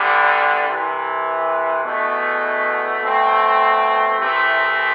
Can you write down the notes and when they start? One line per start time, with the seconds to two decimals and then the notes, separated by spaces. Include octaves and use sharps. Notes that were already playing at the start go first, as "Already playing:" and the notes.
Already playing: E2 D3 G3
0.67 C2 C3 E3
1.85 E2 B2 A3
3.00 B2 A3 C4
4.18 C2 C3 E3 A3 C4